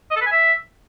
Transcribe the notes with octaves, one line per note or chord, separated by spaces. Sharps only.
D#5
A4
B4
G#5
E5